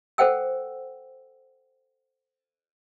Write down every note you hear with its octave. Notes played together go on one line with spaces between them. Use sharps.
A4 C5 F#5 G5 E6